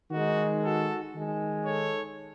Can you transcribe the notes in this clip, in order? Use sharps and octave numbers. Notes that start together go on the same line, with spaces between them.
D#3 G#3 D#4 F#4
F#4 A4
D#3 G#3
A4 C#5